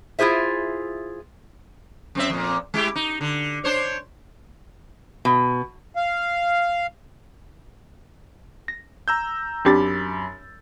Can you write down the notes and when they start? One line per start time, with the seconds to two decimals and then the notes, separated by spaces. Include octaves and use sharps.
0.19 E4 F4 G#4 C5 E5
2.15 F#2 C4 E5
2.30 F2 A#2
2.74 G#3 E4 G4
2.96 D#4
3.21 D3
3.64 D4 C5 C#5
5.25 B2
5.96 F5
8.68 A#6
9.08 A#5 E6 G6
9.65 F#2 C4 D4 G4 B5 A6